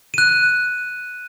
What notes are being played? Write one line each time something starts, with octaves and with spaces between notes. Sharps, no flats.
F#6 D#7